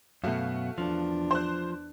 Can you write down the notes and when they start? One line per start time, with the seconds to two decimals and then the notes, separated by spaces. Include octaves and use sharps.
0.24 F#2 B2 A3 F#4 F5
0.78 E2 F3 D4
1.31 C5 F#6